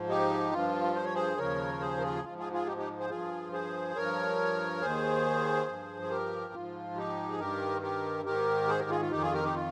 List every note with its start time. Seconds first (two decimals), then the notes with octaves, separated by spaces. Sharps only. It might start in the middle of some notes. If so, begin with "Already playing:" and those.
Already playing: G#2 F3
0.09 D#4 G4
0.52 G2 F3 F4
0.95 C5
1.04 C#5
1.14 G#4 C5
1.37 D#2 C#3 F3 A#4 C#5
1.80 G#4 C5
1.98 A#4
2.02 F4 G#4
2.24 G#2 F3 F4
2.38 F4 G#4
2.53 F4 G#4
2.66 D#4 G4
2.77 D#4 G4
2.99 G#4 C5
3.10 G2 F3 F4 G#4
3.52 G#4 C5
3.95 G2 F3 A#4 C#5
4.81 D#2 D#3 G#4 C5
5.68 G2 F3
6.02 G#4
6.10 G4 A#4
6.53 G#2 F3 F4
6.96 D#4 G4
7.30 G#4
7.39 G2 D#3 G4 A#4
7.82 G4 A#4
8.25 G#2 D#3 G4 A#4
8.69 G#4 C5
8.79 G4 A#4
8.90 F4 G#4
9.01 F4
9.11 F2 D#3 D#4 G4
9.21 F4 G#4
9.33 G4 A#4
9.44 D#4 G4
9.55 F4